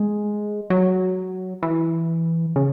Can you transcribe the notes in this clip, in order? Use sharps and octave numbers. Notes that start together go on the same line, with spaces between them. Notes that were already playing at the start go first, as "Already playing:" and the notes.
Already playing: G#3
F#3
E3
C#3